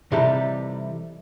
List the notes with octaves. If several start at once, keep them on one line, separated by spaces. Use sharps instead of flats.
C3 E3 G3 D#4 G4 A4